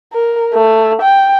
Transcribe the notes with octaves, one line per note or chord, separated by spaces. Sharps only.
A#4
A3
G5